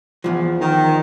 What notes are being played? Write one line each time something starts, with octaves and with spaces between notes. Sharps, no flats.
E2 G2 F3
D#3